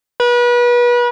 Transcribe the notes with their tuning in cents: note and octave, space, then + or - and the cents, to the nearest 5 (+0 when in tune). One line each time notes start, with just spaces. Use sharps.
B4 -35